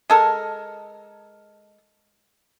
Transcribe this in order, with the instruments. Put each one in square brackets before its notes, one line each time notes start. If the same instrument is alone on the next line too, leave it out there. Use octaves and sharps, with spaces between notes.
[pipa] G#3 A4 A#4